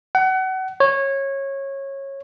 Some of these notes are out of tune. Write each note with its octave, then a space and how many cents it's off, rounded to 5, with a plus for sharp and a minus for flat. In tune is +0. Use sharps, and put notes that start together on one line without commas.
F#5 +30
C#5 -20